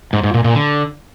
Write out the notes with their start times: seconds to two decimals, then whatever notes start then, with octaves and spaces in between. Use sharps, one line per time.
0.13 G#2
0.23 G#2
0.34 A#2
0.44 A#2
0.55 D3